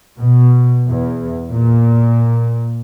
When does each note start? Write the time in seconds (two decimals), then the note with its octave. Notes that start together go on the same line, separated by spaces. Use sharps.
0.18 B2
0.88 E2
1.49 A#2